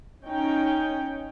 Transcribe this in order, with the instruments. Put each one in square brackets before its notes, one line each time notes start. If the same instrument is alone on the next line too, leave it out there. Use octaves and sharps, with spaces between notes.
[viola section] C#4 D#4 G5